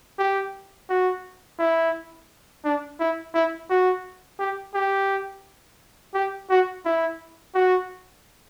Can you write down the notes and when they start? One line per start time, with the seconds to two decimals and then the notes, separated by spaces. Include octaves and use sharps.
0.19 G4
0.90 F#4
1.59 E4
2.64 D4
3.00 E4
3.34 E4
3.70 F#4
4.39 G4
4.74 G4
6.14 G4
6.50 F#4
6.85 E4
7.54 F#4